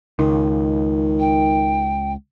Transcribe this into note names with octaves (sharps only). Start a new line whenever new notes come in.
C#2 D#3
G5